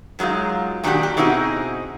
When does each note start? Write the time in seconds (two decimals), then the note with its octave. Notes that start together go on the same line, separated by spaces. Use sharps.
0.19 F#2 F#3 G#3 D#4 F4
0.84 A#2 D#3 A3 D4 F#4 G4
1.03 G4
1.17 B2 C4 D#4 E4 F#4 G#4